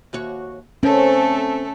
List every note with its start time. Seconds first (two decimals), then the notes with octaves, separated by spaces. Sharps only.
0.13 D#2 F#4 C#5
0.83 A3 C4 C#4 A4 A#4